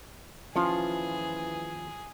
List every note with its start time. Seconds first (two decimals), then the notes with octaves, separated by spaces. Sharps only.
0.56 D#2 E3 F3 C#4 F4 G#4